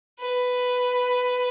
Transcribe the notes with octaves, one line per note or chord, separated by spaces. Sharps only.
B4